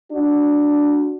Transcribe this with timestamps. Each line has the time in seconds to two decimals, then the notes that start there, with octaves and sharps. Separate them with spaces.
0.12 D4 F#4